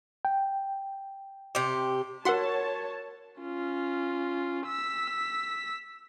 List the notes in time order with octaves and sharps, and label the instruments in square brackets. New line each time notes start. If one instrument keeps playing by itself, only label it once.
[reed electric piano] G5
[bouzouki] C3 G4
[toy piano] F#4 A#4 [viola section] C#5 A5 [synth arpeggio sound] F#5 C6
[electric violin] C#4 F4
E6 B6